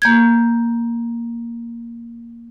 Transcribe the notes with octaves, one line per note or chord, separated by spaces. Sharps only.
A#3 G6 G#6